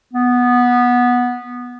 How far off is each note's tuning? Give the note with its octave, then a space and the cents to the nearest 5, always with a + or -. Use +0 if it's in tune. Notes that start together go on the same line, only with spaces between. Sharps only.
B3 -10